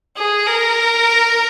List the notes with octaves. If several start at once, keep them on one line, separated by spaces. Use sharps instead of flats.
G#4
A#4